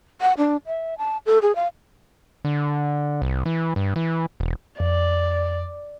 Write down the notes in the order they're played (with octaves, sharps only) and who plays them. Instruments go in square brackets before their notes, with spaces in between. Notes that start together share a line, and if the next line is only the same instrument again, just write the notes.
[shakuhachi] F#5
D4
E5
A5
A4
G#4
F5
[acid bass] D3
C2
E3
G2
E3
E1
[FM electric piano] F2 [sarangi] D5